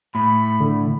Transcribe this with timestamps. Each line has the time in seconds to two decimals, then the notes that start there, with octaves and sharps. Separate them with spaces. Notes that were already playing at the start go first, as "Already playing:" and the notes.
0.15 A2 B5
0.60 D3